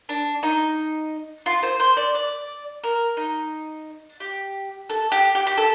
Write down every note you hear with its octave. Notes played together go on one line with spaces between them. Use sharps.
D4
D#4
F4
C5
C5
D5
D5
A#4
D#4
G4
A4
G4
G4
G4
A4